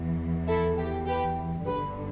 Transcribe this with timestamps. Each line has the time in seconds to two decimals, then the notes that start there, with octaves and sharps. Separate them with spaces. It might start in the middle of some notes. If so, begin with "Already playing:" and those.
Already playing: E2 E3
0.47 E4 A4
0.77 G4
1.06 G4 B4
1.66 G1 G2 D3 G4 B4